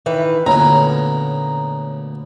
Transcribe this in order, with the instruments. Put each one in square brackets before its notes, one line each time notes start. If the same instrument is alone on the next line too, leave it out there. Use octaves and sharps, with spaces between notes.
[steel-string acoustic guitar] D#3 E3 B4
[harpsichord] D2 A#2 B3 [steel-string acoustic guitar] C#4 [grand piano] A#5